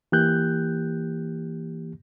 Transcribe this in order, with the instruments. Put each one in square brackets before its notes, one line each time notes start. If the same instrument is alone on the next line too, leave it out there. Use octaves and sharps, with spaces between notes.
[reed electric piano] E3 A#3 G4 F#6 G6